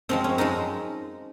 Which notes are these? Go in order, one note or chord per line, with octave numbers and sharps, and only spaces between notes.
F#2 F3 G#3 C4
C#4
F#2 F3 G#3 D#4